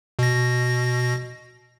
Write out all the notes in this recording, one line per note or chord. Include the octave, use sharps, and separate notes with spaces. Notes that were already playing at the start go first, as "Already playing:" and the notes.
B2 A#6